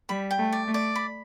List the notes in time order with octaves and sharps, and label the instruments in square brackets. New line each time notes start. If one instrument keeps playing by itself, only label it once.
[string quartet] G3 [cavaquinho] B5
[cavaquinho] G5
[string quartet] A3
[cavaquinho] D5
[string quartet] A3
[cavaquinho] D5
B5